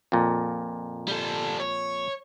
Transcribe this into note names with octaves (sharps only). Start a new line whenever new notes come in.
F2 A#2
G3 A4
C#5